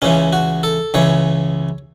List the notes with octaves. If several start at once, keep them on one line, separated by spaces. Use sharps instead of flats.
C#2 C#3 E3 C#4
F#4
A4
C#2 C#3 E3 C#5